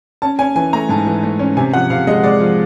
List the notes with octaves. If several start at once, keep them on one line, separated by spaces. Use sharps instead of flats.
C#4 A5
C#4 G#5
E3 G#5
A3 A#5
G#2 A5
E3
A3
C#4
C3 G#5
F3 F#5
C3 F5
G#3 D#5
G#3 D5
F3